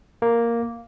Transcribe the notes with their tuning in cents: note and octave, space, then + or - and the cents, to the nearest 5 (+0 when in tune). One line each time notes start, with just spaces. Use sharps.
A#3 +0 A#4 +0